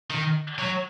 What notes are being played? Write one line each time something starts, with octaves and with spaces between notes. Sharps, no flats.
D#3
F#3